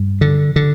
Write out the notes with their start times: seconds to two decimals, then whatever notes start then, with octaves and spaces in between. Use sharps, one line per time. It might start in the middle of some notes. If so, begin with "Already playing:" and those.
Already playing: G2
0.21 D3
0.56 D3